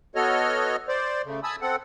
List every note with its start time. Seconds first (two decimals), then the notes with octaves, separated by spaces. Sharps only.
0.15 B3 F#4 A4 C#5 D#5 F6
0.88 C5 D5
1.24 C#3 A3
1.43 G#5 A5 B5 D#6 E6
1.62 C4 A4 F#5